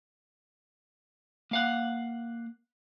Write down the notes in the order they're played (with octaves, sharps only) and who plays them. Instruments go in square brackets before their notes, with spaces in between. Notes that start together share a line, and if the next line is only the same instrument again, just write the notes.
[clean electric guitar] A#3 F5 F#5